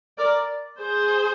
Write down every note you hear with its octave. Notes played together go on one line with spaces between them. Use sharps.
A#4 D5
G#4 C5